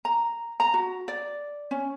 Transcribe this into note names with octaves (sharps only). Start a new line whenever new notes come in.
A#5
A#5
F#4
D5
C#4